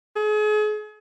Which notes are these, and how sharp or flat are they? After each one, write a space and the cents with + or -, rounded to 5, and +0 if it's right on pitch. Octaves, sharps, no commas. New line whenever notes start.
G#4 +35